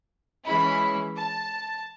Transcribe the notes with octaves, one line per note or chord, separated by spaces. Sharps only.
E3 G#3 C#4 E4 B5
A5